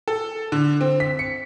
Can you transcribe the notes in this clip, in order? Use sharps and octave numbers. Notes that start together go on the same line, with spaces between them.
A4
D3
C4
B6
C#7